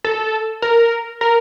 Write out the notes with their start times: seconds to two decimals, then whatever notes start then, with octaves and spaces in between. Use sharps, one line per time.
0.04 A4
0.62 A#4
1.21 A#4